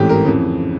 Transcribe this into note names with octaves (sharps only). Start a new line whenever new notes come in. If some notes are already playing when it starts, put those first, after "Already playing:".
Already playing: A1 G#2 E3 A3 C4 G4
A#4
F2 C#3 E3